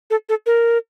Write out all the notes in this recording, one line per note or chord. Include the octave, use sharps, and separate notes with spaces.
A4
A4
A#4